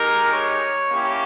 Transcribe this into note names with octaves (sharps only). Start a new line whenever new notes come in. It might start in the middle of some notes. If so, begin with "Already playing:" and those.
Already playing: G#3 D#4 G4 A#4
C#5
A#3 C#4 E4 G4